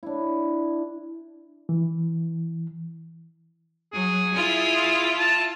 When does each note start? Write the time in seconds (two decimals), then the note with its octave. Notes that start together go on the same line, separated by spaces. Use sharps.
0.03 D4 E4
1.69 E3
3.94 F#3 G#4
4.33 E4 F4
5.18 A5